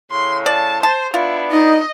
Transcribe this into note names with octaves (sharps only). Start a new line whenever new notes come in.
A2 C#3 C6
D5 A5
C5 A5
B3 D4 E4 F4
D#4 D#5